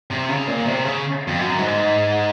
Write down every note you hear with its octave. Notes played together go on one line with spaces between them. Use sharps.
C3
C#3
A#2
C3
C#3
F2
F#2
G#2